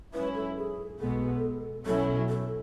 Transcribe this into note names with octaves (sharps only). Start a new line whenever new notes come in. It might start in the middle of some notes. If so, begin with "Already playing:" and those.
G#2 F#3 C#4 E4 B4
A4
G#4
B1 B2 G#3 B3 A4
B1 B2 F#3 C#4 E4 A4
A4